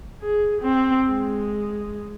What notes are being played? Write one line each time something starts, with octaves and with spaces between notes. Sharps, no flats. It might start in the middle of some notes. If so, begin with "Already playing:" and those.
G#4
C4
G#3